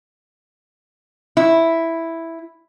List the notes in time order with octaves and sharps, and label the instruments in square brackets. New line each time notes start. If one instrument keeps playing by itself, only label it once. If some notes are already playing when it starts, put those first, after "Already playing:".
[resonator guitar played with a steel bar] E4